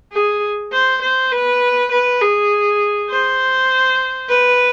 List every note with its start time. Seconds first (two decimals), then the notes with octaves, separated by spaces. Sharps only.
0.13 G#4
0.73 C5
1.02 C5
1.32 B4
1.92 B4
2.21 G#4
3.10 C5
4.29 B4